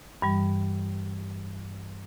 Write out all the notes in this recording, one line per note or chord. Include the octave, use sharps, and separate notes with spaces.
G2 E3 G3